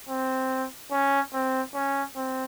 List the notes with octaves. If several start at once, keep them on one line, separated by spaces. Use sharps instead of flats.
C4
C#4
C4
C#4
C4